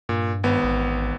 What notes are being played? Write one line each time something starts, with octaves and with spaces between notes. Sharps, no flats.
G2 A#2
G#1 B3
A1